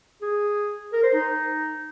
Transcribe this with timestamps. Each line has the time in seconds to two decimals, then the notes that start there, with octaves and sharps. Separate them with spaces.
0.22 G#4
0.93 A#4
1.03 C5
1.13 D#4